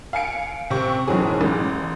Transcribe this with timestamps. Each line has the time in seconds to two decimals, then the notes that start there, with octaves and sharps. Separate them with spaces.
0.13 F5 G#5 C#7 D7
0.70 C3 C4 C#6
1.08 F#1 B1 E3 F#3 G#4
1.41 A1